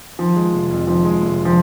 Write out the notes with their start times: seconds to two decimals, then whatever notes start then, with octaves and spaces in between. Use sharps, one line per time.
0.19 D#3 F3
0.36 G#3
0.53 F1
0.71 F2
0.87 D#3 F3
1.05 G#3
1.22 F1
1.45 F3